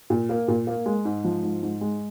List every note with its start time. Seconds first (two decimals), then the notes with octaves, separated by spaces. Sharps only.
0.10 A#2
0.29 A#3
0.48 A#2
0.67 A#3
0.86 G#3
1.05 G#2
1.24 F3
1.43 G#2
1.63 G#2
1.81 G#3